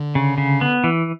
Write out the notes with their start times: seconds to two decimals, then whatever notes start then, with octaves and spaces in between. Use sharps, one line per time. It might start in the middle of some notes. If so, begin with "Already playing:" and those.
Already playing: D3
0.15 C#3
0.38 C#3
0.61 B3
0.84 E3